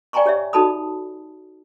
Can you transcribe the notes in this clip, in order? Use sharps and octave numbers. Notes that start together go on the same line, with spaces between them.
D5 G5 G#5 A#5 C6 C#6
G4 C#5 D5 E5
D#4 F#4 A4 A5 B5 D#6